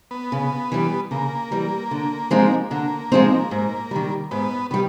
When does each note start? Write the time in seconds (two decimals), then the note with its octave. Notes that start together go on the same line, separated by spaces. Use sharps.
0.11 B3
0.32 C#3
0.72 E3 G3
1.11 C#3 A#3
1.51 E3 G3
1.91 D3
2.31 F3 G#3 C4 D#4
2.70 D3 A#3
3.12 F3 G#3 C4 D#4
3.51 G#2
3.91 D#3 G3
4.31 G#2 B3
4.71 D#3 G3 B3